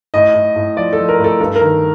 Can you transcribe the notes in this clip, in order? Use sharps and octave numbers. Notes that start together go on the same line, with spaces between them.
A2 D#5
A2
A2
F3 D5
A4
F3
A#4
A2
A4
G2 A4
A#4
D#3